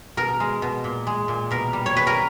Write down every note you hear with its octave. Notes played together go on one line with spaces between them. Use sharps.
B2 A#4
G#3
B2
A#2
G#3
A#2
B2 A#4
G3
C#5
B2 B4
A#4